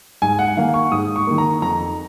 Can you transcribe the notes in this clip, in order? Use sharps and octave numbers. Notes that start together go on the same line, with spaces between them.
G#2 G#5
F#5
D#3 A#3 F5
C#6
G#2 D#6
C#6
D#3 A#3
A#5
F2 A#5